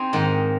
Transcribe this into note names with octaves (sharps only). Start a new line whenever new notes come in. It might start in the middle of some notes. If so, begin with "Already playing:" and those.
Already playing: C4 D#4 G#4
G#2 D#3 A#3